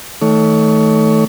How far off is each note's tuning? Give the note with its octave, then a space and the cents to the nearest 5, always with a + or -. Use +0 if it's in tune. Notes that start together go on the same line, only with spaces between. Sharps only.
D#3 +35 A3 +0 C#5 +25